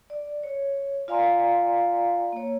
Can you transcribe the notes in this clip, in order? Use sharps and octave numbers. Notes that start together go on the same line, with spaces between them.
D5
C#5
F4 D5 F5 G#5 A#5 C6
A#3 C#5